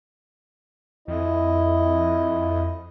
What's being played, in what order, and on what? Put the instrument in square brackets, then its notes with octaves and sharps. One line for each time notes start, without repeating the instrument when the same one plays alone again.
[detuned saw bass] F2 [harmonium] E4 D#5